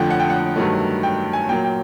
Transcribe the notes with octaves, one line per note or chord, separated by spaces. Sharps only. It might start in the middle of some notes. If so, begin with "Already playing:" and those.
Already playing: F2 D3 F3 A3 F#5 G5
F#5
G5
F#5
G2 D#3 F#3 A3
G5
G#5
A#2 F#3 A#3 G5
G5